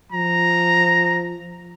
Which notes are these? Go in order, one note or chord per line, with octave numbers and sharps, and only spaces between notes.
F3 A#5